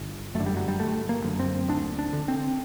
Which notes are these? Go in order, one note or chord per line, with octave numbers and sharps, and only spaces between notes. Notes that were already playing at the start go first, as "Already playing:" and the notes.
Already playing: G1
F#2 D3 A3
G3
F#3
G3
G1 A3
A#3
F#2 D3
C4
D2 D4
D4
D3
C4